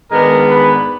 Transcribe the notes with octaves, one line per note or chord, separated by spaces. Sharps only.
G#2 D#3 G#3 B3 D4 A#4 A#5
B4 B5